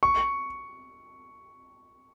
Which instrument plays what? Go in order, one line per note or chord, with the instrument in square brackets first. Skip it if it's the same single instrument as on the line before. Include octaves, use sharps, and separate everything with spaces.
[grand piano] C#6